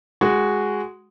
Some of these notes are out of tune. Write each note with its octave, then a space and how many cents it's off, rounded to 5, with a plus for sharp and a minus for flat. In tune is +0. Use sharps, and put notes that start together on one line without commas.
G#3 +0 F#4 +5